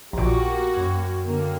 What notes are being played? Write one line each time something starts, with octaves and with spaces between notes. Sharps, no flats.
A#1 A#2 A#3 F#4 G4 A#5 C6 D6
F#2 G5 G#6
D3 A#3